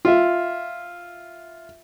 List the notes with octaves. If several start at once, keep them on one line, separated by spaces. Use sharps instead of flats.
F4 E5